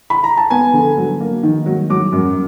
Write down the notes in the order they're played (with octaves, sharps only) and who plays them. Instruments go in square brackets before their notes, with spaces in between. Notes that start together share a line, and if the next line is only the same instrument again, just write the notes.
[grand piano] B5
A#5
A5
[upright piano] B3 [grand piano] G#5
[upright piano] D3
F#3
A#3
D#3
F#3
[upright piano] F#3 [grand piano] D6
[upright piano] F#2